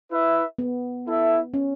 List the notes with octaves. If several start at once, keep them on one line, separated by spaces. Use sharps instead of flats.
E4 B4 E5
B3
E4 A4 E5
C#4